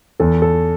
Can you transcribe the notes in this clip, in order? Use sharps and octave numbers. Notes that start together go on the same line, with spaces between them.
E2 A4
A4